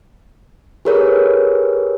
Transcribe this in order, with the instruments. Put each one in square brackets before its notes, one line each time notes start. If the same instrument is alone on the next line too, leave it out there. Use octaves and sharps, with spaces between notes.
[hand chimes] G4 G#4 A#4 B4 C#5